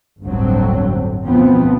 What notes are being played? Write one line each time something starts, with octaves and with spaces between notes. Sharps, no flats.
G1 D2 A2 D3 F#3 C4
D2 B2 F3 B3 C4